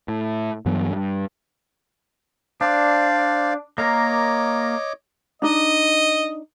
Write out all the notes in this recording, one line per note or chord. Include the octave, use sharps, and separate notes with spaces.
A2
G2 E3 F#3 B3
G2
D4 C5 D5 F5
A#3 A#4 C#5 D#5 D6
D4 D#4 D#5